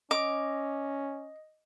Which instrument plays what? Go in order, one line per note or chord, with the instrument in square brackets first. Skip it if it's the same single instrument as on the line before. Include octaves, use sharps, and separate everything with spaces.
[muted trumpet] C#4 [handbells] D#5 [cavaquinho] D6